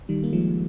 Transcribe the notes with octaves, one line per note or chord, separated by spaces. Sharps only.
D#3 G3
A#3
F3 G#3